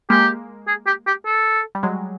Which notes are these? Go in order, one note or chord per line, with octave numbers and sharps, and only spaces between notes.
G#3 A#3 G4
G#4
G4
G4
A4
G3
F#3 G#3